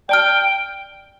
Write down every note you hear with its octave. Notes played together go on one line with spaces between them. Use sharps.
D5 G5 A5 F6